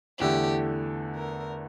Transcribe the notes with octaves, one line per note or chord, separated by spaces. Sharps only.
E2 D3 A3 E4 G4
A#4